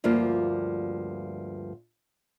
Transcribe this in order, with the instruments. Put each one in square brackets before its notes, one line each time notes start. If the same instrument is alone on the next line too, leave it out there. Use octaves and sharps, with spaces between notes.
[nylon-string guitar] D2 G2 F3 A#3 F4